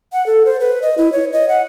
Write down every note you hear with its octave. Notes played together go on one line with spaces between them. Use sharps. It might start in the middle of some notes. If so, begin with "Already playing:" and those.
F#5
A4
C5
B4
D#5
E4
C#5
D#5
F#5